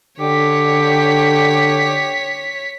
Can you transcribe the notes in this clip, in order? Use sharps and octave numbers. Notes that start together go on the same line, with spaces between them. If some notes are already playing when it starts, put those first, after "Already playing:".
D3 G4 C#5 B6